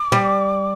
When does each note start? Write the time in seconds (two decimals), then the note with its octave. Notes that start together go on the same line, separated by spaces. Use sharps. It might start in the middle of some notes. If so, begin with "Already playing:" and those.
Already playing: D6
0.12 G3